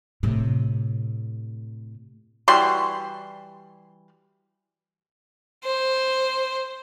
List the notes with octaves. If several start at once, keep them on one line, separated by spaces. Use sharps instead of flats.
A2 C3
E3 G3 F#4 C6
C5